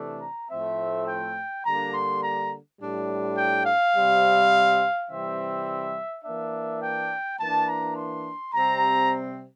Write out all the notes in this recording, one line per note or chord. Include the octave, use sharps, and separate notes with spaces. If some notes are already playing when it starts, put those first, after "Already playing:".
Already playing: C3 E3 A3 D4
A#5
A2 F3 A3 C4 E5
G5
D3 G3 A#3 D4 A#5
C6
A#5
A2 G3 D4
G5
F5
C3 G3 C4
C3 E3 G3 C4 E5
E3 A#3 D4 E5
G5
E3 A#3 D4 A5
A#5
C6
C3 G3 C4 A#5